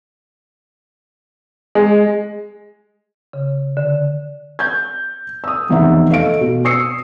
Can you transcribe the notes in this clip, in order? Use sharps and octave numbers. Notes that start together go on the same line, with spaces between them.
G#3
C#3
D3
G6 G#6
D#6 E6
F1 E2 D#4 E5 F#5
A3 D#5 F5 D7
B2
D#6 E6 C7 C#7